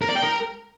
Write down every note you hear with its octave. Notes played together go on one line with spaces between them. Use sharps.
A#4
D5
G5
A#4